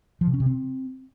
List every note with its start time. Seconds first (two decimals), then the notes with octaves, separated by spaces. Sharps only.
0.21 F3
0.27 C3
0.34 C#4
0.40 C3
0.46 C4